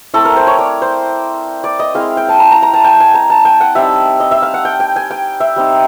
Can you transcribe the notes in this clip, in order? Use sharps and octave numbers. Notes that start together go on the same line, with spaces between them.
A3 C4 E4 A4
A#4
C5
C#5
D5
C5
D5
D#5
G#3 C4 E4 F5
G5
A5
A#5
A#5
A#5
A5
G5
G#5
A#5
A5
G5
F#5
G3 C4 D#4 E5
D#5
E5
F5
F#5
G5
G5
G#5
G5
E5
G3 C4 D#4